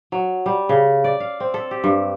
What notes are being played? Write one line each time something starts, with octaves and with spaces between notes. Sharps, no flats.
F#3
G3
C#3
D5
F5
C4
A4
G4
G2